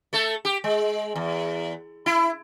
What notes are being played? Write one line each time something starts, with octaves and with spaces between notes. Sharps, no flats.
A3 A4
G4
G#3
E2
E4